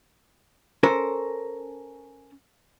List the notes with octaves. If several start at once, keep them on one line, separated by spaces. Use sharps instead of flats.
C#4 A4 A#4 C5